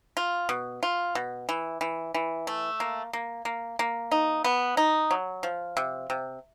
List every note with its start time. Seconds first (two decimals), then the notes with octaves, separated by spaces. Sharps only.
0.17 F4
0.49 B2
0.83 F4
1.15 B2
1.49 E3
1.81 E3
2.14 E3
2.47 A3
2.80 A#3
3.13 A#3
3.45 A#3
3.79 A#3
4.11 D#4
4.44 B3
4.77 D#4
5.11 F#3
5.43 F3
5.77 C3
6.10 C3